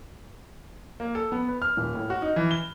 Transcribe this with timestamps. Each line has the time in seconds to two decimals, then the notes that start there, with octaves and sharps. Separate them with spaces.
1.00 A#3
1.15 A4
1.32 B3
1.48 B4
1.62 F6
1.77 D#1
1.95 A2
2.10 F#4
2.22 D#4
2.36 E3
2.51 G7